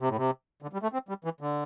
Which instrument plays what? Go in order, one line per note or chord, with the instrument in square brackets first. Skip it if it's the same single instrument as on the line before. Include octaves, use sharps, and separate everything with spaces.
[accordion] C3
A2
C3
D3
G3
A3
C4
G3
E3
D3